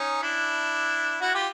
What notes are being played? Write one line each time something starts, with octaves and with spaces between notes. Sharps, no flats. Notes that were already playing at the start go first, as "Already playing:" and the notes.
Already playing: C#4 D#4
D4 E4
E4 F#4
F4 G4